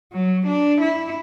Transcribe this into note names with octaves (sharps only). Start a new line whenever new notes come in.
F#3
D4
E4